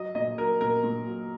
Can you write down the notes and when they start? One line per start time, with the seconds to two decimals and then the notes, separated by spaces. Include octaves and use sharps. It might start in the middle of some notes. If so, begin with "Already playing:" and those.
Already playing: F#3 D#5
0.15 A#2 D#5
0.38 F#3 A#4
0.61 A#2 A#4
0.83 A#2
1.07 F#3